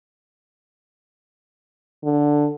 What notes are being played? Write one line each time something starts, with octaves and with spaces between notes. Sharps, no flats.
D3